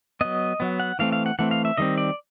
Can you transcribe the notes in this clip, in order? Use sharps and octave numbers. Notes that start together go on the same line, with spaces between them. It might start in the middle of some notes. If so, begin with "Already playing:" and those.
F#3 B3 D#5
F#3 B3
F#5
E3 A3 C4 F5
F5
F#5
E3 A3 C4 F#5
F5
E5
D#3 G3 C4 D#5
D5